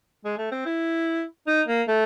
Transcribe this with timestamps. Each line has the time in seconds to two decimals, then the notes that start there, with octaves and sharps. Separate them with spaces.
0.24 G#3
0.38 A3
0.51 C4
0.66 E4
1.47 D#4
1.68 A#3
1.88 A3